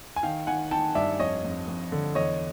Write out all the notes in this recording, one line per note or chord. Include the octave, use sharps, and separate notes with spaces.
G#5
D#3 F5 G5
D#3 F#5 G#5
D#3 G5 A5
G2 D5 E5
F2 C#5 D#5
F2
F2
D3
E2 C#5 D#5